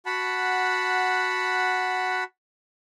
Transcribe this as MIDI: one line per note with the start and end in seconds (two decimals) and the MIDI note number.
0.06 2.24 66
0.06 2.24 78
0.06 2.24 81
0.06 2.24 83